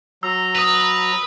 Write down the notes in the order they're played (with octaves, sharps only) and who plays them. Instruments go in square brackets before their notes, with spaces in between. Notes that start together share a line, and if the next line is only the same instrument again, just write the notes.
[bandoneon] F#3 A#5 [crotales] E6
[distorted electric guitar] B4 [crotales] D#6 F7